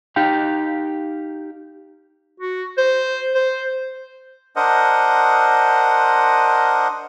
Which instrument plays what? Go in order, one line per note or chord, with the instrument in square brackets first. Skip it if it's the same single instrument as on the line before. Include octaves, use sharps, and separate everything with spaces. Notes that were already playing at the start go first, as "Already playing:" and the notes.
[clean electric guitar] D#4 G4 F5 G5
[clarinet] F#4
C5
C5
[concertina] D4 A#4 C5 D#5 F#5